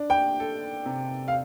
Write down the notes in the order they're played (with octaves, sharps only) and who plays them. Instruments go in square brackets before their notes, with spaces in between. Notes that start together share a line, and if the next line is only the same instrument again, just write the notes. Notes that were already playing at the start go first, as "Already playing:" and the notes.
Already playing: [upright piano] D4
[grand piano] G5
[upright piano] A4
C3
[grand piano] F5